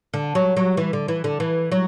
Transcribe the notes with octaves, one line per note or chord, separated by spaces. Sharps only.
D3
F#3
F#3
E3
D3
E3
D3
E3
F#3